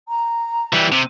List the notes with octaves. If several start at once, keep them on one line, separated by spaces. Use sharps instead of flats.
A#5
E3 G3
C3